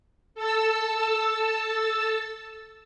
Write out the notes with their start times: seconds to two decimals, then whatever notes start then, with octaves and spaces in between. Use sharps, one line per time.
0.35 A4 A5 E6